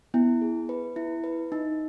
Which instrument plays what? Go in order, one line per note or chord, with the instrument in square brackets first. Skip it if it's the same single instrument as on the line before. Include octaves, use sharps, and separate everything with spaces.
[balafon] B3 [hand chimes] E4
[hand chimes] G#4
B4
E4
B4
D#4